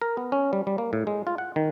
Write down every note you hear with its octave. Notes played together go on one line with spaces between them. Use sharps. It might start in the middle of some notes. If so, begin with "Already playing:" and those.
A#4
B3
C#4
G3
G3
A#3
A2
G#3
F4
F#5
D#3